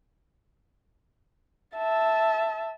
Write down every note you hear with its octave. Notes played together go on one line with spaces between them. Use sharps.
E5 A5